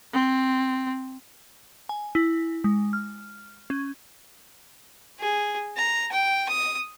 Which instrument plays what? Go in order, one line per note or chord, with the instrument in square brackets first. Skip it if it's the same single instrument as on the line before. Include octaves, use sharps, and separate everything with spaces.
[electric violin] C4
[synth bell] G#5
E4
G#3
F6
C#4
[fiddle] G#4
A#5
G5
D#6